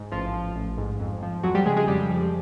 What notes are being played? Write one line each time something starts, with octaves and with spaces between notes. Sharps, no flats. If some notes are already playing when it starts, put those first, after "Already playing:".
Already playing: G#2
A1 F3 F4
F3
A1
G#2
F2
F3
F2 F#3 F#4
G3 G4
C#3 G#3 G#4
G#3 G#4
F2 G3 G4
F3